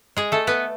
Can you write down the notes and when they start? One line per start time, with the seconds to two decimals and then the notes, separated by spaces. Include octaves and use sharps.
0.17 G#3 G#4
0.32 A3 A4
0.47 B3 B4